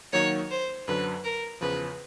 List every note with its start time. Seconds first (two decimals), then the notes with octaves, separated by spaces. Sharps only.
0.13 D#3 F#3 A#3 D#4 F#4 C#5
0.51 C5
0.87 F#2 D3 F#3 B4
1.24 A#4
1.61 E2 C#3 F3 B4